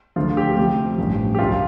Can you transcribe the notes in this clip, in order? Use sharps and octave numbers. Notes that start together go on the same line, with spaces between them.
D2 D3 F3 F4
G4
D2 C3 F3 G4
A1 G2 F3
G4
C2 C3 F3 F4